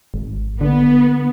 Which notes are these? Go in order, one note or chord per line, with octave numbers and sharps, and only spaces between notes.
G#1
D3 B3